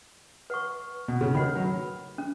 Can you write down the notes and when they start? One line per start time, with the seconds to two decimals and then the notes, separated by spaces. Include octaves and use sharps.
0.50 B4 F#5 C#6
1.08 B2
1.21 C#3
1.34 D#3 B4 F#5 B5
1.55 F#3
2.18 C#4